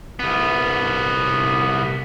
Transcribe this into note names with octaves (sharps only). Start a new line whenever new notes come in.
C2 B3